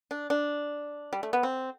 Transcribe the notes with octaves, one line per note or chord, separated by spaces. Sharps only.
D4
D4
G3
A3
B3
C4